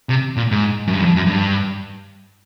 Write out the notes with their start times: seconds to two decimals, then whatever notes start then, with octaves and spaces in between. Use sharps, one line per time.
0.09 C3
0.37 A#2
0.51 G#2
0.87 F#2
0.93 G2
1.01 E2
1.05 F2
1.16 F#2
1.26 G2